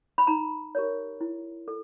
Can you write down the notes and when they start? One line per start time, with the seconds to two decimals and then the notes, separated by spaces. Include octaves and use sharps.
0.18 B5
0.27 D#4 A#5
0.75 G4 A#4 C#5
1.21 E4
1.68 A4